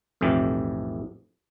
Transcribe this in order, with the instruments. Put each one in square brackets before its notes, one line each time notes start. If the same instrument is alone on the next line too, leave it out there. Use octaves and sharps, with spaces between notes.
[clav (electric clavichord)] B1 F2 A2 E3 G4